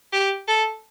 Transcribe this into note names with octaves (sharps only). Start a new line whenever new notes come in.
G4
A4